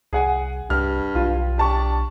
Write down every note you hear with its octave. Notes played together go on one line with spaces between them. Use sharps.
C2 G#4 F#5 G#5
C2 G2 F6
B1 F4
D4 G4 A5 C#6